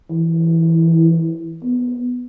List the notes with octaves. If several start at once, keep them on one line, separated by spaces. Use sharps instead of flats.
E3
B3